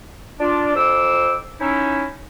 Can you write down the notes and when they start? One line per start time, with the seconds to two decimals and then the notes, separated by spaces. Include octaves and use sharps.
0.39 D4 F4 D5
0.76 F2 C5 D6 E6
1.60 C#4 D#4 E4